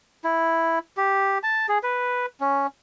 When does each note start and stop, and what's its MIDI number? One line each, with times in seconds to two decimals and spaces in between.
0.24 0.79 64
0.97 1.38 67
1.43 1.67 81
1.68 1.78 68
1.83 2.26 71
2.40 2.67 61